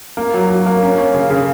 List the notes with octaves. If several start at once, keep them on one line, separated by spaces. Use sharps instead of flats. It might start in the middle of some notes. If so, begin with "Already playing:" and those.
A#3
F#3
F#3
A#3
C#4
C#4
C#3
C#3